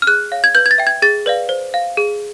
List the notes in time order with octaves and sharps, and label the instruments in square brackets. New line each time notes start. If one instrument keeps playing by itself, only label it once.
[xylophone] F6
G#4 F#6
C#5 F5
G#6
B4 G6
G#6
A6
E5 G5
G#6
G#4 A6
B4 D5 F5
C5
F5
G#4